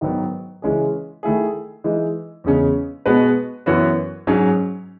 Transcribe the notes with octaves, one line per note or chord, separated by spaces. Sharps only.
G#2 D#3 F#3 B3
C#3 E3 G#3 C#4 G#4
D#3 A3 E4 G#4
E3 G#3 D#4
E2 C#3 G#3 C#4
B2 G#3 B3 F#4 B4
F#2 E3 B3 F#4 C#5
G#2 F#3 C#4 G#4